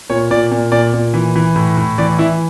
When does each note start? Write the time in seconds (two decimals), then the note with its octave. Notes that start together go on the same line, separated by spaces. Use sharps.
0.10 A#2 C#5
0.31 A#2 D5
0.51 A#2
0.72 A#2 D5
0.93 A#2
1.14 E3
1.36 E3
1.56 A2
1.77 A2
1.98 E3 D5
2.19 E3 E4